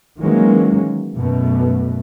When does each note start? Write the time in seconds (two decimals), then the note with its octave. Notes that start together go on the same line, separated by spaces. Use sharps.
0.19 D#3 E3 F#3 G#3 A#3 C#4
1.16 F#2 B2 A3